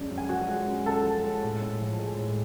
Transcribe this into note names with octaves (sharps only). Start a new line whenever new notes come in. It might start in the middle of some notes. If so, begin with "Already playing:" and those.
Already playing: F#2 F3 G#3 D4
F#2
G#5
F3 F#4 F#5
G#3
F#2
F#2 A4 A5
F3
G#3
A2
A2
F3
G#3
A2